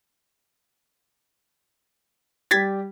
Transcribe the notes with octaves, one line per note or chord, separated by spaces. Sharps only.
G3 G4 G#6 A6 B6